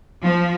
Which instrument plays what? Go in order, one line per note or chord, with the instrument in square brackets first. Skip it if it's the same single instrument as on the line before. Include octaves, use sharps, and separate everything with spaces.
[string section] F3